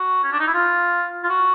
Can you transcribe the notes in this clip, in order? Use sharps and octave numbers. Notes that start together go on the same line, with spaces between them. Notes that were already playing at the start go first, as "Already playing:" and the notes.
Already playing: F#4
C#4
D4
D#4
E4
F4
F4
F#4